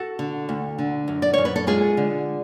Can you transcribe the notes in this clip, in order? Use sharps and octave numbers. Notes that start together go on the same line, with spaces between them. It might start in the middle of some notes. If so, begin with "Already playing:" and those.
Already playing: F#4 A4
D3
D2
D3
F#2
D5
F#2 C#5
B4
A4
G#3 F4 G#4
D3